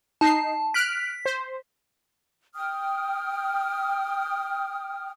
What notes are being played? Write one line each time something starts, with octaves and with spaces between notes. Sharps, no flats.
D#4 A5 C7
F6 F#6 B6 D7
C5
G5 D#6 F6